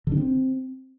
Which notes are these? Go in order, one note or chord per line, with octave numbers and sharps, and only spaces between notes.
D3
D4
C4